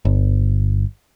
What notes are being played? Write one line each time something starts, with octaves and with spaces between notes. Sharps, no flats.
G1